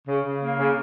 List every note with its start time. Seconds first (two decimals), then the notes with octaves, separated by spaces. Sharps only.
0.08 C#3
0.25 C#3
0.42 A#3
0.60 C#3